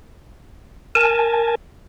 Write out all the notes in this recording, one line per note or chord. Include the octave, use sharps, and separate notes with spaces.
A#4 G#5 A5